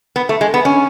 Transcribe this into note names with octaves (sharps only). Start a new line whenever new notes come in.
B3
A3
G#3
B3
C#4